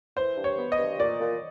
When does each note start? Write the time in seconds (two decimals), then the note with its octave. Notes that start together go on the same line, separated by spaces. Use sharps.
0.17 E3 C5
0.37 G2
0.44 C#5
0.58 B3
0.72 D#5
0.78 G2
0.99 A#2 D5
1.20 A#2